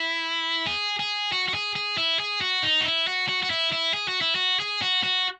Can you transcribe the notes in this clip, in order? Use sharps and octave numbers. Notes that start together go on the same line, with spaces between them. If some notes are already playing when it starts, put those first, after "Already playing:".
Already playing: E4
G#4
G#4
F#4
F#4
G#4
G#4
E4
G#4
F#4
D#4
F#4
E4
F#4
F#4
F#4
E4
E4
G#4
F#4
E4
F#4
G#4
F#4
F#4